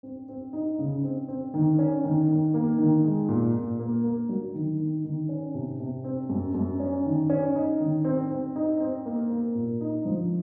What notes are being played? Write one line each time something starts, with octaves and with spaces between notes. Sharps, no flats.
C4
C4
D#4
C#3
C4
C4
D#3
C#4
D#3
D#3
A#3
D#3
G#3
A#2
A#2
A#3
A#3
F#3
D#3
D#3
D#3
C#4
C3
C3
C4
F#2
F#2
C#4
D#3
C#4
D#4
D#3
C4
C4
D#4
C4
A#3
A#3
A#2
D#4
F3